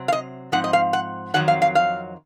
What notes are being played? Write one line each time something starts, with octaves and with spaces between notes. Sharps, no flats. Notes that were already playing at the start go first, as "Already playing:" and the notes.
Already playing: C3 F#3 C4
F5
D#5
G#2 F3 C4 F#5
D#5
F5
F#5
F2 D#3 F#3 C4 F#5
F5
F5
F5